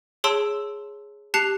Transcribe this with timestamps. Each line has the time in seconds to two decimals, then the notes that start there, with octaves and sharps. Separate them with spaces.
0.24 G#4 C#5 A5 C6 E6 D7
1.34 G4 A5 F#6 C7 C#7 F7